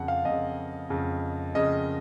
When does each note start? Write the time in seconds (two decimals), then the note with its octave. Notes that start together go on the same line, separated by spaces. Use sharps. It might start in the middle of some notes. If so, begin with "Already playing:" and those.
Already playing: F2 C#3 F#5
0.08 F5
0.25 F2 C#3 D#5
0.90 F2 C#3
1.55 F2 C#3 D#5